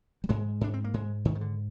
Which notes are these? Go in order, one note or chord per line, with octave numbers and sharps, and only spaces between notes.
G3
G#2 G#3
G#2 D4
C4
A#3
G#2 G#3
G#2 D#3
D#3
D3